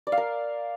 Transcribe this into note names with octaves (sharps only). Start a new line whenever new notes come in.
D5
F5
A#4